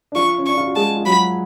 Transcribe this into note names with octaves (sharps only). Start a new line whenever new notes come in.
D4
F3 F4 C#6
C#4
D4 C#6
F4
F#4
G#3 G#4 A5
F4
F#3 F#4 B5